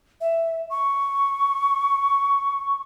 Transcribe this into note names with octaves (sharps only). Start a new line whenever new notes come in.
E5
C#6